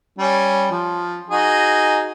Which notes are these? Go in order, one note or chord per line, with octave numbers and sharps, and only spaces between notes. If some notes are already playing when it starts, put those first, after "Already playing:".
G3 C#4
F3
D#4 F#4 G#4